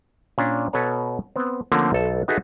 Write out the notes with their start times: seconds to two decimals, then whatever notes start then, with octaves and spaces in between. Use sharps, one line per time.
0.38 A#2 C#4 D4
0.73 B2 A4 B4 C#5 A#5
1.36 B3 C4
1.72 D3 F3 A3 A#3 C4 C#4
1.93 B1 A4 A5
2.28 D#4 F#4 G#4 A4 B4 E5